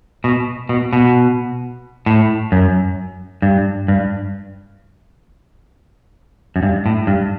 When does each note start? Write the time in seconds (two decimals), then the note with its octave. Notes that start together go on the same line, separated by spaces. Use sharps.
0.24 B2
0.69 B2
0.93 B2
2.06 A2
2.52 F#2
3.42 G2
3.88 G2
6.56 F#2
6.63 G2
6.86 A2
7.07 G2